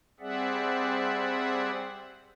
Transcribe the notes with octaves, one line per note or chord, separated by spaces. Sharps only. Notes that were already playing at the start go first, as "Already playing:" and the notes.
G3 C4 G#4 D5 E5 F#5